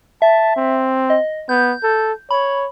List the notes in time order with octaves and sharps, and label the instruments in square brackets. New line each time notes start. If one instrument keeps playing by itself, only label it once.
[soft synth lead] E5 [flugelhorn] A5
[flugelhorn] C4
[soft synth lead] D#5
[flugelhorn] B3 [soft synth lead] G6
[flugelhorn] A4
[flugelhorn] C#5 [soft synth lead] B5